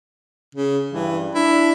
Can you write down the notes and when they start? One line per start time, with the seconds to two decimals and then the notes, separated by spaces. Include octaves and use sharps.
0.55 C#3
0.92 G2 E3
1.35 D4 E4